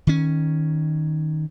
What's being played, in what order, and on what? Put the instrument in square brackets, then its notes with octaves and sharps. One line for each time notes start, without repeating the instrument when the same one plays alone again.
[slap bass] D#3 C#4